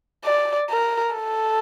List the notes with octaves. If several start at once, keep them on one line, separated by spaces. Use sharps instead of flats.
D5
A#4
A4